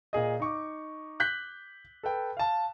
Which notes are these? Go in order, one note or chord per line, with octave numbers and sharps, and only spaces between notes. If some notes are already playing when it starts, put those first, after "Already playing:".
A#2 G#4 D#5
D#4 C#6 D6
F#6 G6 B6
A4 B4 G5
F5 A5